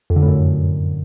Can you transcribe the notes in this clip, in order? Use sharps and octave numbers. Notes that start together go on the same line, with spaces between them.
F2
D3
A2
F#2